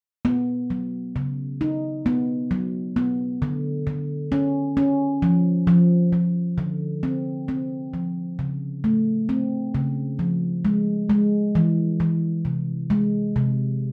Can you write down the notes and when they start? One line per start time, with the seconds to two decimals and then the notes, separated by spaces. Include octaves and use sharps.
0.25 B3
0.70 F#3
1.16 C#3
1.61 D#4
2.06 B3
2.51 F#3
2.96 B3
3.42 D3
3.87 D3
4.32 C#4
4.77 C#4
5.22 F3
5.67 F3
6.13 F3
6.58 D3
7.03 C4
7.48 C4
7.94 F3
8.39 C#3
8.84 A3
9.29 C4
9.75 C#3
10.19 F3
10.65 G#3
11.10 G#3
11.55 E3
12.00 E3
12.45 C3
12.90 G#3
13.36 C3